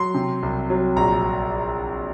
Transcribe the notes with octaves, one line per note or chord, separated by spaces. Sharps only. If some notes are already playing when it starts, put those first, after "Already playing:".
Already playing: F#3 C6
C3
C2
F#3
A#1 A#5